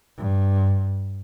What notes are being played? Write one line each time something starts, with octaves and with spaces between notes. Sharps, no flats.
G2